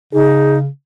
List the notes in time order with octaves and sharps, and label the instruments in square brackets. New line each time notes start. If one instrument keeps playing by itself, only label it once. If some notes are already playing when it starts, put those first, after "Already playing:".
[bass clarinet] C#3 [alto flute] D#4 [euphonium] G#4